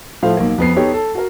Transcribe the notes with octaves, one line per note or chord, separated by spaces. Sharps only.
A2 F3 A3 C5 F5
B1 A#3
F2 B3 C7
B3 D#4 G4 A4 C#5
A4
F#4 A#4